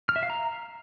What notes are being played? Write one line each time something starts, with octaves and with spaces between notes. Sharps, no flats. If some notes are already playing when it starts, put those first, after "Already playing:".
F6
E5
F5
A#5